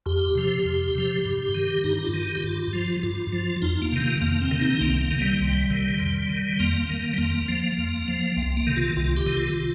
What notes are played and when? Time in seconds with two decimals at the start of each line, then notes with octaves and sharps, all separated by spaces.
0.06 F2 G4
0.35 C3 F3
0.65 F2
0.95 C3 F3
1.25 G2
1.55 D#3
1.84 G2 D#4
1.98 D#4
2.04 F4
2.14 D#3
2.35 G4
2.44 G2 F4
2.73 F3
3.03 G2 F4
3.33 F3
3.62 F2 D#4
3.82 A#3
3.92 C3 D#3
4.02 A#3
4.21 F2 A#3
4.41 C4
4.51 C3 D#3
4.61 D#4
4.75 C4
4.81 C2 A#3
5.01 A#3
5.11 C3 D#3
5.20 G3
5.41 C2
5.70 C3 D#3
5.99 F2
6.29 D#3
6.59 F2 A#3
6.89 D#3
7.14 G3
7.18 F2 A#3
7.48 F3
7.78 F2
8.08 F3
8.37 C2
8.57 A#3
8.67 C3 D#3
8.76 F4
8.97 C2 F4
9.17 G4
9.26 C3 D#3
9.36 F4